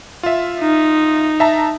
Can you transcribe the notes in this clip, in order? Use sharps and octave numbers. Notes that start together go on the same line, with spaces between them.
F4 E5
D#4
E5 A5 A#5